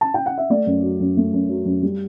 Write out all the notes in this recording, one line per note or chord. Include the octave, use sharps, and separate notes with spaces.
A5
G5
F#5
E5
A3 D5
F#2
F#3
F#2
A3
F#2
F#3
F#2
G3